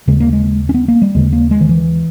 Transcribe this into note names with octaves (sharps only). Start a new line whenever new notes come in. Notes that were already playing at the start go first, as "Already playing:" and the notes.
D#2 C#3 G#3
A#3
G#3
C#4
B3
A#3
G3
D#2 C#3 G#3
A#3
G#3
D#3
E3